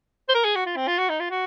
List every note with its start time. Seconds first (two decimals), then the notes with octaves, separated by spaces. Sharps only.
0.29 C5
0.34 A#4
0.44 G#4
0.55 F#4
0.66 F4
0.76 C4
0.87 F4
0.98 F#4
1.09 D#4
1.20 F4
1.30 F#4